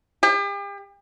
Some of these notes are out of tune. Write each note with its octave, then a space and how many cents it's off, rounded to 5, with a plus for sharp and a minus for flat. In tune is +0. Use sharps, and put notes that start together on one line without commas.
G4 +40